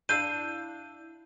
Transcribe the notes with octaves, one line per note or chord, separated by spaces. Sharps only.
D4 E4 F5 E6 G6 D#7